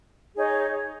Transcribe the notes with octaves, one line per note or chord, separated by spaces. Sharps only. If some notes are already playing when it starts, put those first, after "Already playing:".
D#4 G#4 C#5